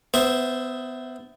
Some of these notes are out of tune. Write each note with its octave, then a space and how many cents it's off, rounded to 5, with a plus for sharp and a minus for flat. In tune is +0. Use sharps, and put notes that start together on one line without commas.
B3 +25 C5 +0 E5 +0